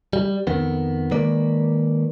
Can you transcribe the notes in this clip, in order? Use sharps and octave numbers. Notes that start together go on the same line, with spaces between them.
G3
F2 D#3 B3
D#3 G#3 A#3 B4 D5